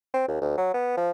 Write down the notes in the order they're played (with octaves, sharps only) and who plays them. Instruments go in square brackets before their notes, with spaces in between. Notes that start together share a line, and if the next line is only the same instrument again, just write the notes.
[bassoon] C4
D#2
D2
F#3
B3
F3